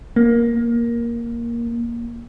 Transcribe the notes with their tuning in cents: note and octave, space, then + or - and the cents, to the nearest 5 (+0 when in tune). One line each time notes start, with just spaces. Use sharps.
A#3 +10